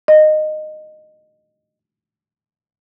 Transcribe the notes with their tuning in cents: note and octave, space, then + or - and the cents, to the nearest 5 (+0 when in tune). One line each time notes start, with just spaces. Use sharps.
D#5 -15